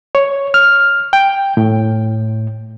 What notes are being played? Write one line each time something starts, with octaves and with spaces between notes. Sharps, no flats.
C#5
F6
G5
A2